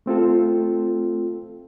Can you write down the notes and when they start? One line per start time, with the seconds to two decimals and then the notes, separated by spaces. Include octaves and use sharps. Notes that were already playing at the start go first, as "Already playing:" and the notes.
0.06 A3 C4 F4 A4